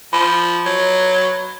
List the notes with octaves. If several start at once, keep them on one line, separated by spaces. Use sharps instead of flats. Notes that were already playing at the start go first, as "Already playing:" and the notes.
F3 B5
F#3